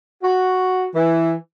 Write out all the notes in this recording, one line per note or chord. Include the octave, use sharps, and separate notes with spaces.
F#4
E3